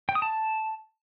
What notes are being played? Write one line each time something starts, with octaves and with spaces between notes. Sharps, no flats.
G5
D#6
A5